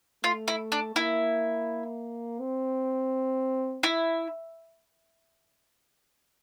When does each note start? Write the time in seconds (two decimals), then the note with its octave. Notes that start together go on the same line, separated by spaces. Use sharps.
0.24 A3 F4
0.48 E4
0.72 D4
0.95 A#3 E4
2.39 C4
3.83 E4